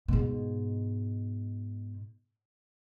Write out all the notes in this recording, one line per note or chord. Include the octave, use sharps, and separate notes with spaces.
G#2 B2